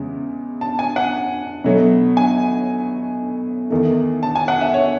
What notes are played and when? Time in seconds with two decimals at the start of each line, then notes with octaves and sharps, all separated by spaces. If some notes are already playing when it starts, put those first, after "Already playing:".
Already playing: E2 C#3 G#3
0.61 A5
0.79 G#5
0.96 F#5
1.64 B2 F#3 A3
2.17 G#5
3.70 E2 D#3 A3
4.23 A5
4.36 G#5
4.48 F#5
4.61 E5
4.74 C#5